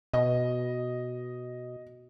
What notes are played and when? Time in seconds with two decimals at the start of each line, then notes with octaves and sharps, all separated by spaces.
0.13 B2 D#5